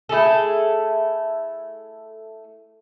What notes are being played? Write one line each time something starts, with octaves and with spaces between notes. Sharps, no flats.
A3 E4 G#4 A4